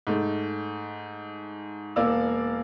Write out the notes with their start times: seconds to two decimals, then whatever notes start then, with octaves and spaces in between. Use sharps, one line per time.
0.07 G#2 A3
1.96 E1 A#3 D5 F5 E6